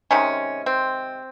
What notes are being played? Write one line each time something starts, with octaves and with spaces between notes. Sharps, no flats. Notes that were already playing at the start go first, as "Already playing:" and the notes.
C3 D#3 G#3 C#4
C4